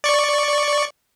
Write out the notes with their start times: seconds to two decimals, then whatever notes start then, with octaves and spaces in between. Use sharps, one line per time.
0.04 D5 C#6